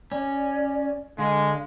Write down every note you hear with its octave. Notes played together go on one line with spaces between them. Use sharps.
C#4 D5
D3 G#3 F5